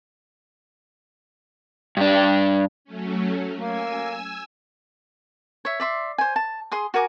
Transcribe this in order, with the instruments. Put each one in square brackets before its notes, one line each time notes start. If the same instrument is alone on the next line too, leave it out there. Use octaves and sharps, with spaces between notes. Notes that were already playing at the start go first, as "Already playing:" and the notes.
[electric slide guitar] G2 D4
[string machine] F#3 A3 C#4
[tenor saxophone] A#3 [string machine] G#5 E6
[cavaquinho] C#5 E5
D5 E5 C6
C5 G#5
A5
G#4 C6 D#6
F#4 A#4 G#5 D6